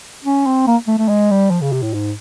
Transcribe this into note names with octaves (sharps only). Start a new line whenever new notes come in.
C#4
C4
A#3
A3
A3
G#3
G3
F3
C#3
C3
A2
G#2